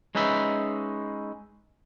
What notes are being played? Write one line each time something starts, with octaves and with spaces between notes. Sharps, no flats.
G#3 C#4 D#4 B4 E5